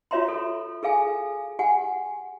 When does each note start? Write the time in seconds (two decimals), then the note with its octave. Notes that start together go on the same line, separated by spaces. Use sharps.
0.11 F4 F#4 C#5 E5 A#5 C6
0.28 A4
0.83 G#4 A4 F5 G#5
1.59 G4 F#5 G#5